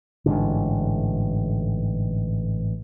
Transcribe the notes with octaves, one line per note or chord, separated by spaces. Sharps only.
A1 G#2 D3